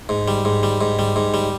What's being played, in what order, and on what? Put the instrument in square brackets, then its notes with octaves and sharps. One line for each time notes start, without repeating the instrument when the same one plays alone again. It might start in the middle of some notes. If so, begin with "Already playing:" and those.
[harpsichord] G#2
G3
G#2
G3
G#2
G3
G#2
G3